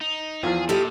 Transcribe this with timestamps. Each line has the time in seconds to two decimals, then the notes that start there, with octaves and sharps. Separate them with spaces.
0.01 D#4
0.43 E2 F3 F4 G#4
0.69 A#2 E4 G4 A4 D#5